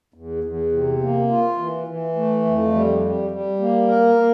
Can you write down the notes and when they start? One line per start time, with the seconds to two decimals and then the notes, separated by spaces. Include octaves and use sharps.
0.14 E2
0.44 E2
0.72 C3
1.01 A#3
1.29 F4
1.58 E3
1.87 E3
2.16 A3
2.45 F2
2.73 G3
3.02 G3
3.31 G3
3.59 A#3
3.88 A#4
4.16 A#3